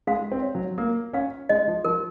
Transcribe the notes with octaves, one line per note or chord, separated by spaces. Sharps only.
G#3 F5
C4
C#5
F#3
A#3 A#4
C#4 F5
G#3 D#5
F3
F3 A#4